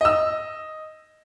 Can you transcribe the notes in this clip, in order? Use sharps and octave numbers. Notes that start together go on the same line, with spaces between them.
D#5 E6